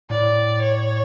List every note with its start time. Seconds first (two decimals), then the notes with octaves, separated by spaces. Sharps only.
0.10 A2 D5
0.61 C#5